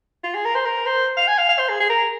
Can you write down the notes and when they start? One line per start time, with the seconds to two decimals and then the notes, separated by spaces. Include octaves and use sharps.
0.24 F4
0.35 G#4
0.45 A#4
0.55 C5
0.66 A#4
0.86 C5
1.17 F5
1.28 G#5
1.38 F5
1.49 F5
1.59 C5
1.69 G#4
1.80 G#4
1.90 A#4